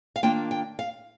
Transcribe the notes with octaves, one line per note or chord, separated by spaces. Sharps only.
F5
D#3 A#3 D4 F4 G5
G5
F5